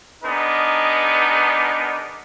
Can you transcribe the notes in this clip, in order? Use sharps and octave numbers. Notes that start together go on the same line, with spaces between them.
B3 D4 D#4 G#4 A#4